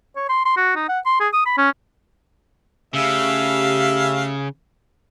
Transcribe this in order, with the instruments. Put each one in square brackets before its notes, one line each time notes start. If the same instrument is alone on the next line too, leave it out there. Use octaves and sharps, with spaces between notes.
[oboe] C#5
C6
C6
F#4
D#4
F#5
C6
G#4
D#6
B5
C#4
[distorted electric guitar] C#3 [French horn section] A3 G4 [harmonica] E5 F5